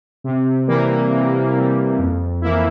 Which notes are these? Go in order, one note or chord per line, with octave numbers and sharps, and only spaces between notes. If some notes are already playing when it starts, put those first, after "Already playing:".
C3
E3 G3 A#3
C3
E3 G3 A#3
F2
E3 A#3 E4